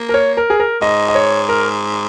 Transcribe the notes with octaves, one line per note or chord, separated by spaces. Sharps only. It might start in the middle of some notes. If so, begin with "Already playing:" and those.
Already playing: A#3
A#4
C#5
A#4
G#4
A#4
G#2 D#5
D#5
C#5
A#4